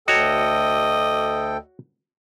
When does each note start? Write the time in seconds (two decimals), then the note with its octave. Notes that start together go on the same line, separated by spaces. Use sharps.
0.08 D2 F#4 A4 C#5 D#5 G5